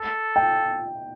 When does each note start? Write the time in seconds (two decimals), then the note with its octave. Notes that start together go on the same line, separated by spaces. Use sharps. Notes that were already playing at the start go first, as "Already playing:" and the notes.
Already playing: A4
0.36 G5